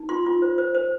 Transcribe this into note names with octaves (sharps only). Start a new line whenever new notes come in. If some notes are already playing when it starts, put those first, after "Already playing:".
Already playing: D#4
F4 C6
F4
C5
C5
C5